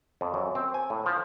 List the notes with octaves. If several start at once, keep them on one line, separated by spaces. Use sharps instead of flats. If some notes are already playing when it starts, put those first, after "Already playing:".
F2
F#2
C4
G#5
A2
F3